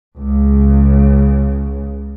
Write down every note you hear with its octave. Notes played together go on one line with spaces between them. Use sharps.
C#2 C#3